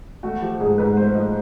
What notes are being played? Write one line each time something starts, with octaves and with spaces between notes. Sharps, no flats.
A3 F#4
F3 G4
G#2 G#4
G#2 B4
A3 C5
F3 D#5